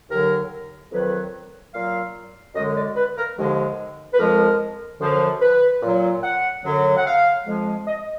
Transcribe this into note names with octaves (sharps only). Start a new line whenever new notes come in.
D#2 D3 F#3 A#4
F2 D#3 F#3 B4
A#2 F#3 F5
F#2 D3 G#3 D#5
D5
B4
A#4
D#2 D3 F3 G#3
B4
F2 F3 G#3 A#4
F#2 D3 F3
B4
A#2 F#3
F#5
F#2 D3 F#3
F#5
F5
F2 F3 G#3
D#5